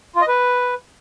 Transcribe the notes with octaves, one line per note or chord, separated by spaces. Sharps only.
F4
D#5
B4